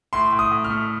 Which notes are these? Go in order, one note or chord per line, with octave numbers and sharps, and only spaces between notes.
A2 C6
A2
D#6
A2
F6
A3